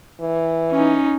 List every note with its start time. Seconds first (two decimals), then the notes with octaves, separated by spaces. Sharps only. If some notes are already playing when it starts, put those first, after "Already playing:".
0.21 E3
0.72 C#4 D#4